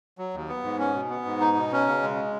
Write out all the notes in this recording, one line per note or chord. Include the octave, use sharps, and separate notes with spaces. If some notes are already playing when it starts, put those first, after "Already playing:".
F#3
D#2
B3
G#2
C#4
B2
B3
G#2
D#4
B2
C#4
C#3
G#3